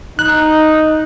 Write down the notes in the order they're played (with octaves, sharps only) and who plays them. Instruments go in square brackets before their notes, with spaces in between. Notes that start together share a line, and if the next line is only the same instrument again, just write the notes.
[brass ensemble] D#4 [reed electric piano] F#6